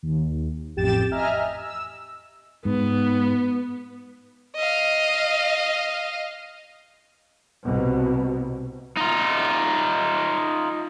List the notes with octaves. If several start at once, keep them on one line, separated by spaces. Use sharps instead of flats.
D#2
A1 F2 G4 G5 A6 E7
D#5 E5 G#5 A#5 F6
E6
G#2 B3
D#5 F5
C2 B2
D#4 F4